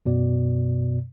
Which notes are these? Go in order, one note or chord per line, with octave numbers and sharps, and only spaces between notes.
F#2 B2 D5